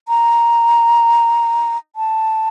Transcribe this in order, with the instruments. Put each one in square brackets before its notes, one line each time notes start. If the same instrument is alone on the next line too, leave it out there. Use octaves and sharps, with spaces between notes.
[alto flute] A#5
A5